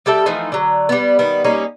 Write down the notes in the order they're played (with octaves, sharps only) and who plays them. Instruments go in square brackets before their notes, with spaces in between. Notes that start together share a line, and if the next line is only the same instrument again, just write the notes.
[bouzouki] G3 G4 A4 E5
E3 F3 A3 D#4
D3 F#3
G3 B3
D#3 G3 B3
G3 A#3 C#4 D#4